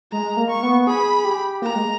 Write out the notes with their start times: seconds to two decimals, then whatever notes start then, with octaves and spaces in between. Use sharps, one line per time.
0.12 G#3 A#5
0.37 A#3
0.50 C#6
0.63 B3
0.87 G#4 B5
1.25 G4
1.62 A#3 A#5
1.75 G#3